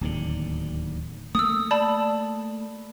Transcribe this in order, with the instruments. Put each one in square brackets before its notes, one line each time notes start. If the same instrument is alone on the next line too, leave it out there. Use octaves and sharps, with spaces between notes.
[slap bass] D1 D#2 D3
[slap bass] A3 A#3 [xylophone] D#6 E6
[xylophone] D5 A5 B5